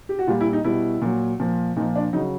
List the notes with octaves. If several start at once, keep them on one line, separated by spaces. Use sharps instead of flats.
G4
F#4
A#2 G3 F4
E4
D#4
B2 G3 E4
A#2 F#3
A#2 F3
A#2 F3 D#4
D4
C#3 F#3 D#4